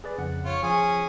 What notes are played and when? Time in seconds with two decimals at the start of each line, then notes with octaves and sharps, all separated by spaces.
0.04 G#4 B4 D5
0.18 F2 C#3 F#5
0.45 F4 C#5
0.63 F3 C#4 G#4